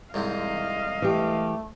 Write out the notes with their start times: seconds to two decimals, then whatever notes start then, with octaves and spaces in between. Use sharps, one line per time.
0.14 C2 G#2 C3 D#5 F5
1.02 E3 A3 G4